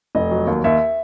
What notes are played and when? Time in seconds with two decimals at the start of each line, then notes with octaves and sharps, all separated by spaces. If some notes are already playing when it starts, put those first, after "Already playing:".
0.15 F1 D#5
0.31 F#3
0.47 D#2
0.64 D#2 E5